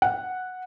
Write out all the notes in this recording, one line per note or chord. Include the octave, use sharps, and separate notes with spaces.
F#5